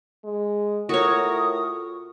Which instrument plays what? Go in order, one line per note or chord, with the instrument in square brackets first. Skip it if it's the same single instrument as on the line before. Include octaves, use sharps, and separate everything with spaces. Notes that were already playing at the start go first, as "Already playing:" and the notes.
[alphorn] G#3
[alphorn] A2 [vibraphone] F4 C#6 [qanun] F#4 C#5 [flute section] A#4 D#6